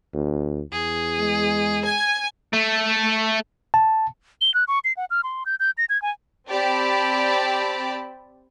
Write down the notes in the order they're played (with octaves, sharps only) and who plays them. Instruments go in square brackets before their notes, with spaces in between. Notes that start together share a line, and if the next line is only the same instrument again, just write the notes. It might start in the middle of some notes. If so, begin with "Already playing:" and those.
[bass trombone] D2
[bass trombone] E2 [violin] G#4
[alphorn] G#3
[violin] G#5 G#6
[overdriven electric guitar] A3
[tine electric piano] A5
[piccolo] G7
F#6
C#6
C7
F#5
F6
C6
G6
G6
A#6
G#6
G#5
[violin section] C4 G4 D5 A5 B5